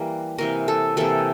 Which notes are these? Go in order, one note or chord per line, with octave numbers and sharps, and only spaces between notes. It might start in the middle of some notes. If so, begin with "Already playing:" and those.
Already playing: E3 G3 A#3
C3 E3 A#3 A#4
A4
C3 E3 A#3 A4